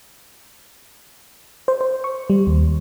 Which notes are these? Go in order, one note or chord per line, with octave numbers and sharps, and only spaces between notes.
C5
C5
C#6
G3
D#2